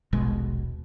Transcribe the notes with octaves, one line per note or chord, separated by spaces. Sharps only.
D#1 A#1 B2 G#3